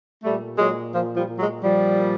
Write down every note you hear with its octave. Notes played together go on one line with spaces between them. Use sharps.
A#2 G3 A3
A#2 F#3 G#3
A#2 F3
F3 G3
A#2
F#3 G#3
A#2 F3 G3
A#2